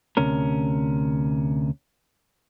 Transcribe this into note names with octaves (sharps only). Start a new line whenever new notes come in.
D2 C3 C#4 A#4